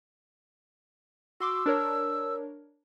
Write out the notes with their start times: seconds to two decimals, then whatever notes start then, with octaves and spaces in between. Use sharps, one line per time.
1.40 F#4 C6 D6 E6
1.66 D4 A#4 C#5